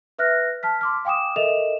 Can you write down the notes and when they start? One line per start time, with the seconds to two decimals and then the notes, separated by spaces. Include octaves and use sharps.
0.19 B4 E5 F6 F#6 A#6
0.63 A5 F6 B6
0.81 C6 D6 F6
1.05 F5 G5 G#5 D6 D#6 E7
1.36 A4 A#4 D#5 E5 E7 F7